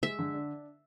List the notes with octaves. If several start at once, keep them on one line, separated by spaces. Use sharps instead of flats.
G#3 E5
D3
D4